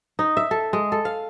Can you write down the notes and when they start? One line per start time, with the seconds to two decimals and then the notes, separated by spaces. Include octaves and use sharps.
0.19 D#4
0.37 E5
0.51 A4
0.73 G#3
0.92 A4
1.05 F5